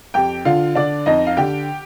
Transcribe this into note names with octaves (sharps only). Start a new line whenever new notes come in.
F2 G4 G5
D3 F4 F5
D3 D4 D5
F2 D#4 D#5
F5
D3 G4 G5